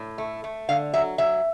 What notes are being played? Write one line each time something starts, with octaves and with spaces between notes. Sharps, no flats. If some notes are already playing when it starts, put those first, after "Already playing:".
Already playing: A2
A3
A3
D3 F5
F#3 E5
F#3 E5